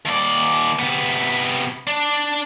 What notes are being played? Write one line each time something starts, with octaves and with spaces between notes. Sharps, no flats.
D#2 D5
C3 B3
D4